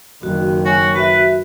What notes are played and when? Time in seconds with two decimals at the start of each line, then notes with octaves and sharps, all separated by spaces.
0.23 F#1 D#3 F#4
0.66 F#4 C#5 G#5
0.96 F#4 B4 E5